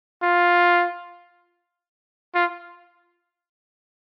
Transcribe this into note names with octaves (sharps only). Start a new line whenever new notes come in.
F4
F4